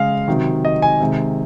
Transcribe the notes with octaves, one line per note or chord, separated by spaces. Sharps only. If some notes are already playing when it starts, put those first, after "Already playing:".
Already playing: C#3 G#3 F5
C3 D#3 F#3
D#5
G#5
C3 D#3 G#3